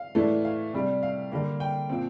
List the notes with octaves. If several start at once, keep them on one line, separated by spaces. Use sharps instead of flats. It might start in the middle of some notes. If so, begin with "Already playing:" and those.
Already playing: F5
A2 E3 A3 D4
F5
C3 G3 D4
F5
D3 G3 A#3 D4
G5
A#2 F3 C4